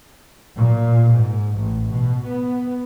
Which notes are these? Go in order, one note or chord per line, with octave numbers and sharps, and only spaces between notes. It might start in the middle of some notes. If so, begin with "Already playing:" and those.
A#2
G#2
A1
B2
B3